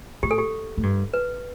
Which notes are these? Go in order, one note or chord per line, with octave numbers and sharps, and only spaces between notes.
A2 G4
A4
G4
A2
G2
B4